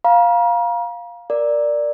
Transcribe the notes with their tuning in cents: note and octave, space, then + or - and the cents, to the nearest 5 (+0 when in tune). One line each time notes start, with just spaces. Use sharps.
F5 +0 A#5 +40
A#4 +5 D5 +0